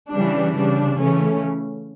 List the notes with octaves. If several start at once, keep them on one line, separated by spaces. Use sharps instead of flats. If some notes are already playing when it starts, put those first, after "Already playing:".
C#3 E3 G3 D4
C#3 G3 D4
C#3 E3 A3 C#4